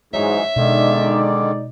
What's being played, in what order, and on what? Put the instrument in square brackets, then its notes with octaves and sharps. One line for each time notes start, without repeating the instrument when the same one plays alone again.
[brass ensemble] G#2 [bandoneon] E3 F#3 D#4 [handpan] C#5 [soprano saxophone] E5
[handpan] B2 [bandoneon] D3 D#3 [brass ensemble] G#3 D#4 D5